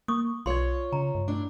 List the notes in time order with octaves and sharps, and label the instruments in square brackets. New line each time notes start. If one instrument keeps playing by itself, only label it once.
[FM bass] A#3 [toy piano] C#6 D#6
[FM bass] B1 [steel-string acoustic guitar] F4 C#5 [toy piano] D5 C6
[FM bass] C#3 [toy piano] A#5
[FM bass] G2
[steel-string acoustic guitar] A2 D4